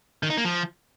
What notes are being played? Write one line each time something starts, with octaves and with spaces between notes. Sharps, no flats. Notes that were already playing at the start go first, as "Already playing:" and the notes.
D#3
D#4
A#3
F3